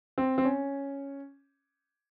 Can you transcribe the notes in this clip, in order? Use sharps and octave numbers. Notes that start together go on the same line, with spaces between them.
C4
C4
C#4